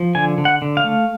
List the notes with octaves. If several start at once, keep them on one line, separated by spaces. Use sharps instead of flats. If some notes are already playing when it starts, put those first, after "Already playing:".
Already playing: F3
D3 G#5
D3
F#5
D3
F5
A3